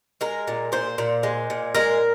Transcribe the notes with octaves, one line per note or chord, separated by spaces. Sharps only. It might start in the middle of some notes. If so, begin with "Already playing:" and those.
G#3 A#4
A#2
A#2 C5
A#2
G#3
A#2
G#3 A#4